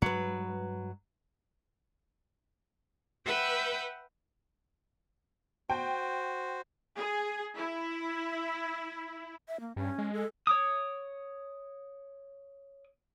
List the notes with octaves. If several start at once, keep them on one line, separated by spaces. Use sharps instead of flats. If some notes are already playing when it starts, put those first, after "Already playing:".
G2 F#3 G#3 B4
B4 E5 F#5 G5 E6 G6
F#4 C5 G5
G#4
E4
E5
A#3
G2 C#4
G#3
A4
C#5 D6 D#6